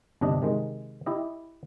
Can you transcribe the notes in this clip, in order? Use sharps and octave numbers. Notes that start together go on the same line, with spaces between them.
G1 C3 D4 D#5
C3 D#3 G#3
E4 G4 D#5